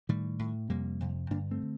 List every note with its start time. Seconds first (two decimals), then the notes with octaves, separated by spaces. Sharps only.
0.09 A2 D#3 G3
0.39 A2
0.69 F2 C3 G3 A#3
1.00 F2 C3
1.30 G2 D3 A#3 D4
1.51 A3 C4
1.62 D3